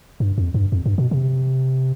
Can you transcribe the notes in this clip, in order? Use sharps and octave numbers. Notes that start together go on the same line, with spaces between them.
G2
F2
G2
F2
G2
B2
C3